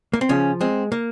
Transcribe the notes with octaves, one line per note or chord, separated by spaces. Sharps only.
A#3
C4
C#3 F3 C#4
G#3 C4
A#3